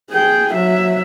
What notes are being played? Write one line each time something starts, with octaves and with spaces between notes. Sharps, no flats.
G#4 G5
F#3 E5